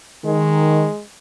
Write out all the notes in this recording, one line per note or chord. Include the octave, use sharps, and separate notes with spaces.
D#3 G#3